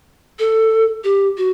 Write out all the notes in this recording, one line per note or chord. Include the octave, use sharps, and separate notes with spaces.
A4
G4
F#4